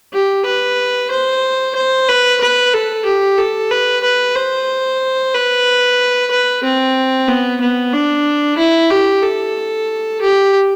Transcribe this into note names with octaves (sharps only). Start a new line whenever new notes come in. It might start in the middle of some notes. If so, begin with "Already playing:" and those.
G4
B4
C5
C5
B4
B4
A4
G4
A4
B4
B4
C5
B4
B4
C4
B3
B3
D4
E4
G4
A4
G4